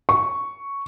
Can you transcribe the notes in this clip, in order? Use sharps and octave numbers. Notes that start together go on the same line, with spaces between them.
C#6